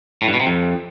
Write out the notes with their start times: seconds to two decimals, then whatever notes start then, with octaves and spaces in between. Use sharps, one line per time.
0.22 A2
0.28 G2
0.34 B2
0.40 C3
0.46 F2